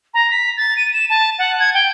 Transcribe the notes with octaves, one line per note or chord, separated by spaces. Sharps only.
A#5
B6
A6
D#7
E7
A5
F#5
G#6
G5